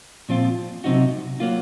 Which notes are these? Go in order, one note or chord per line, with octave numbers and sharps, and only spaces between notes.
A#2 F3 C4 F4
C3 F#3 C4 D#4 F#4
F#3 A#3 F4